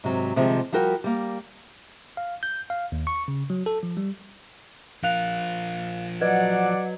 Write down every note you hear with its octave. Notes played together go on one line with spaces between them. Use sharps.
G#2 C3 F#3
C3 D#3 F3 G3 G#3
F3 G3 F#4 A#4 G5
G3 A#3
F5
G6
F5
D#2
C#6
C#3
F#3
A4
F3
G3
F3 A#4 F5 F#6 F7
F#3 B4 D5 D#5 F#5 G#6